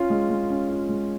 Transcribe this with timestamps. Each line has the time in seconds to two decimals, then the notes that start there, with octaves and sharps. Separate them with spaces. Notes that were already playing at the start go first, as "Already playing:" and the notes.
Already playing: C#4 F4
0.10 G#3
0.30 G#3
0.50 C#4
0.69 F4
0.89 G#3